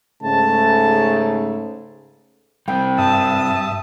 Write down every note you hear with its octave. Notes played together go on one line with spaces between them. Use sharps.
G#2 C#3 A3 A5
G3 C4 G5
G2 E5 A5 D#6